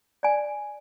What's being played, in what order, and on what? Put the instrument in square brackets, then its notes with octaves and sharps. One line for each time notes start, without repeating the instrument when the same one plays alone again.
[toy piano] D5 G#5